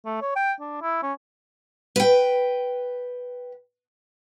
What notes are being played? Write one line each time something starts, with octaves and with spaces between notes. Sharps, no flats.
A3
C#5
G5
D4
E4
C#4
B4 G5